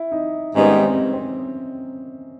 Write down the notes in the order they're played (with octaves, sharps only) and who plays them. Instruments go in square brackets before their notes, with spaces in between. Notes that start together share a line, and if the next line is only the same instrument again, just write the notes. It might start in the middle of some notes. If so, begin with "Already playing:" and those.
Already playing: [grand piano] E4
D#4
[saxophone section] G#2 D#3 G3 B3 D#4 [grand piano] C#4
[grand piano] C#4
C4
C4